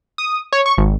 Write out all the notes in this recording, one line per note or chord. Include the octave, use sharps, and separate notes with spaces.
D#6
C#5
C#6
G#1